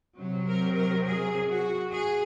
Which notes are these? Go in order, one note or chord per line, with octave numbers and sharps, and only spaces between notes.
C3 F#3
A#4
A#4
G#4
F#4
G#4